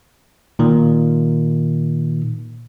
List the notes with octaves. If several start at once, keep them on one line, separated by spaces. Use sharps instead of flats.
A#2 D#3